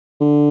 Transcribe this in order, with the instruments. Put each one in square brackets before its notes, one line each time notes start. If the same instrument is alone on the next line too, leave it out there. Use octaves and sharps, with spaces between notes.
[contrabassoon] D3